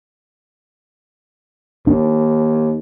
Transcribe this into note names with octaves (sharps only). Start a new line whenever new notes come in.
D#2 D4